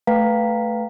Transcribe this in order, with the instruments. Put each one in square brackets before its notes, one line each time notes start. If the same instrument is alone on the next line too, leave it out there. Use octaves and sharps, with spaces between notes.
[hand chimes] A3 B4 F5 G5 A#5 B6